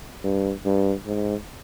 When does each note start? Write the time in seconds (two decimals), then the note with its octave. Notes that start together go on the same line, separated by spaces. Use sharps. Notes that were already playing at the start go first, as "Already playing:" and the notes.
0.24 G2
0.65 G2
1.06 G#2